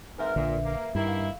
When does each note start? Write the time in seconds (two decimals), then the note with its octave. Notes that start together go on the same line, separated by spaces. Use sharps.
0.18 G#2 C4 A#4 B4 E5
0.36 A#1 A#2 D3
0.65 A#3
0.95 G2 D#3 A#3 E4
1.09 F5